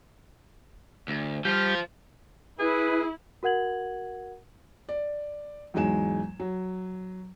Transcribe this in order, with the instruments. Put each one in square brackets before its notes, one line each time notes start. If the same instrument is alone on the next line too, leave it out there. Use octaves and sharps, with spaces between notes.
[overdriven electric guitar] D2
[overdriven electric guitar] F3 F4 [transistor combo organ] G3 G4
[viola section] E4 [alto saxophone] G#4 [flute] B4
[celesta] F#4 A#4 F#5 G#6 F#7
[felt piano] D5
E2 G#2 F#3 G#3 G#5 E7
F#3